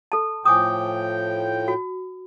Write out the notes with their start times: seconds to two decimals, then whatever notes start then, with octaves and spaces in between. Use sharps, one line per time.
0.12 A4 A5
0.45 A2 F3 G5 G#5 D6 D#6
1.68 F#4